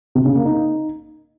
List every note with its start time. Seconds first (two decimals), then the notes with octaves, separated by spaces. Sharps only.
0.15 C3
0.25 C#3
0.35 A#3
0.45 D#4